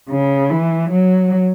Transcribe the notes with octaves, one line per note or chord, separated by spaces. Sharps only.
C#3
E3
F#3